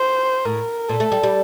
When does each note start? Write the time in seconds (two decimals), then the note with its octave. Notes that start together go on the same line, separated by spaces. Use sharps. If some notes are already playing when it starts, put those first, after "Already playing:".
Already playing: C5
0.45 A2 A#4
0.89 A#2 A4
1.00 A3
1.12 G3
1.23 G3